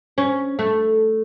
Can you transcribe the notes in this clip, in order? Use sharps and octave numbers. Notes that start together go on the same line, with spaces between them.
C#4
A3